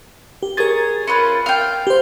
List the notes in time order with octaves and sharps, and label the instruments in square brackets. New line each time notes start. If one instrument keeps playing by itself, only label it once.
[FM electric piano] G4
[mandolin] G#4 C#5 [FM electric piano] A#4 A6
[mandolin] C#4 F4 B4
F5 G5
[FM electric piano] G4 C5